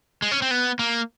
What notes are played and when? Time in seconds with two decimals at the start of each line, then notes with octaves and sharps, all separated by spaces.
0.22 G#3
0.31 C#4
0.42 C4
0.51 B3
0.79 A#3